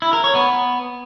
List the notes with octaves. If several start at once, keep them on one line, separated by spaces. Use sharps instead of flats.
E4
A#4
C#5
B3